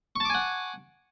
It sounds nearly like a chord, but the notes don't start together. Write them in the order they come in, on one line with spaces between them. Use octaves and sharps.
C#6 A5 D6 G#5 F#5